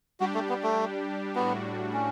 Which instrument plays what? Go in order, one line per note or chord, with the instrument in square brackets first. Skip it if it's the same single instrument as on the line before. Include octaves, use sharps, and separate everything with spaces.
[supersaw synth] G3 D4 G4 [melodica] F#4
[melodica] A3
B3
A3
[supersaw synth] A2 G3 D4 F#4 [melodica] B3
[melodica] C#4